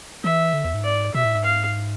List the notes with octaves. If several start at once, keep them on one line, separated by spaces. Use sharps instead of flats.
E3 E5
D3
E2
G#2
D5
B2 E5
A2
G#2
F5